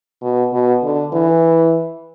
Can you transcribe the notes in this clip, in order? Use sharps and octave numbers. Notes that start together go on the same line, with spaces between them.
B2
B2
D3
E3